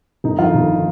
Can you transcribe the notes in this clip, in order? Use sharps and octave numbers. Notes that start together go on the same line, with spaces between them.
G1 D#4
F2 D#3 F4
G1 D#4
D#3